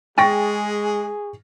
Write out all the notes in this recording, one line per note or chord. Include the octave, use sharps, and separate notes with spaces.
G#3 G#4 G5 C#6 A6 A#6